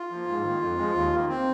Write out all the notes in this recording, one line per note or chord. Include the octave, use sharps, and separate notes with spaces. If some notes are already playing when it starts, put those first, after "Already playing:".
Already playing: F4
F3 A#3
G#2
D#3 A#3
F2
F3 G#3
D#2
D#3 A#3
C4